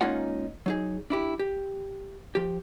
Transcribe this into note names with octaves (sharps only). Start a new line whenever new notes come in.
G#3 A#3 C#4 D#4 F4 F#5
F#3 D#4 G#4
D4 E4 G4
G4
F3 G4